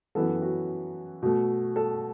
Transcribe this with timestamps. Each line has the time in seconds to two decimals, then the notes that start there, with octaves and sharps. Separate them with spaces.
0.15 F#2 E3 B3 A4
0.42 F#4
1.22 B2 A3
1.76 A4